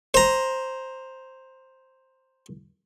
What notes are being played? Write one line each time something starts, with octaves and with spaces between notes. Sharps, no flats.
C5 A#5